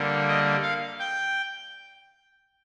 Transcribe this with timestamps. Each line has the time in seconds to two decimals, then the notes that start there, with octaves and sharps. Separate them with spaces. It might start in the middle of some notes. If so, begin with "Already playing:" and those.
Already playing: D3 G3 A#3
0.28 D#5
0.63 F5
0.99 G5